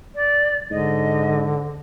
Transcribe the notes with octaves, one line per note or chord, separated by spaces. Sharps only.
D5
G#2 D3 D#5